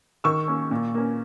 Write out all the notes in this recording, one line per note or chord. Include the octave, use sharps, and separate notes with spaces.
D#3 C#6 E6
A#3 C#4
A#2
A#3 C#4